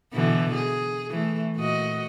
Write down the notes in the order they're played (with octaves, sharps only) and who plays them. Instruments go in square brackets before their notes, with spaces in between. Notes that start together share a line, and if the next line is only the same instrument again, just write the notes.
[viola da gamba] B2 D3 E3
G#4
E3 A3
A#2 F#4 D#5